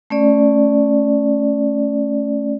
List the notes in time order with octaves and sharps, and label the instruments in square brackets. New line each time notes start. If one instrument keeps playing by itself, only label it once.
[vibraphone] A3 C#4 D5